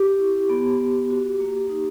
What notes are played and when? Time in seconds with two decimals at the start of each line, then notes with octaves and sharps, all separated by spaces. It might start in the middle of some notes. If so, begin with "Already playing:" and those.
Already playing: G4
0.19 E4
0.49 B3
0.80 B3
1.10 F#4
1.40 A#3
1.69 D#4